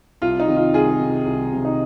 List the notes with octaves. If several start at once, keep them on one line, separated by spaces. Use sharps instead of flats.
C2 F4
D#4
C3 D#3
F4
C2 F4 G#4
C3 D#3
C2
C3 D#3
D#4